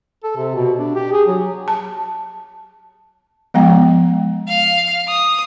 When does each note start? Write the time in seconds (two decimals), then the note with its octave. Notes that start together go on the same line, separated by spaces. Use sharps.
0.24 A4
0.37 C3
0.55 B2
0.79 D4
0.95 G4
1.13 G#4
1.28 F#3
1.68 A5
3.54 F3 G#3 B3 G5
4.48 F5
5.08 D#6